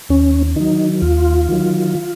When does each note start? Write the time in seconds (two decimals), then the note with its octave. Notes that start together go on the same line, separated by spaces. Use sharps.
0.09 D#2 C#4
0.56 D#3 F#3 D#4
1.02 D#2 F4
1.49 D#3 F#3